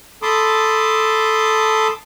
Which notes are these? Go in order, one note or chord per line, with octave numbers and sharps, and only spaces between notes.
A4 A5 B5 C6 D6 D#6